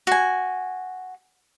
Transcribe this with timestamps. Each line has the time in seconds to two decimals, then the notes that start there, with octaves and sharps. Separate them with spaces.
0.07 F#4 G#5